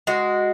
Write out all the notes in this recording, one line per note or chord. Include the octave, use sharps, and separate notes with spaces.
G#3 F#4